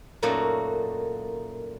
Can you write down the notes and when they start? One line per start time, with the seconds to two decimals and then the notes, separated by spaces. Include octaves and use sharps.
0.22 F#2 A#2 A3 D#4 F#4 D5